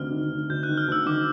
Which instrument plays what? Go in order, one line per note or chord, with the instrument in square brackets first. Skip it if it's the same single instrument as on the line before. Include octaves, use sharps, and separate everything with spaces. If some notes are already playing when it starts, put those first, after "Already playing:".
Already playing: [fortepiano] D2 C3 D#3 [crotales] F6
[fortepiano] D#3
D2
[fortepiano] D2 [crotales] G6
[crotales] F#6
[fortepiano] D#3
[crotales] F6
[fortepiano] D2 [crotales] E6
[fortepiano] D#3 [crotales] D6